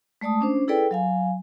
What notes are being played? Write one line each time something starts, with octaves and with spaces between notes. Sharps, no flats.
G#3 A3 D5 A5 D#6
C#4 D4 C5
E4 G#4 A4 B4 D5 G5
F#3 F5 G#5